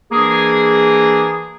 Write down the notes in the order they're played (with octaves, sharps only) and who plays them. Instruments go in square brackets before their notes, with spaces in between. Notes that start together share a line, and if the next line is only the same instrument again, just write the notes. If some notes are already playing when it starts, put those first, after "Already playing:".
[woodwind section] E3 A#3 D4 G#4